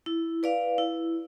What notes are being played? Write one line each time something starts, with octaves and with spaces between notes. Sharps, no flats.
E4
B4 D5 F5
E4